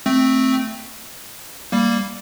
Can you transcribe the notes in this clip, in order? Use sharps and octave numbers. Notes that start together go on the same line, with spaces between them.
A3 C4
G3 A#3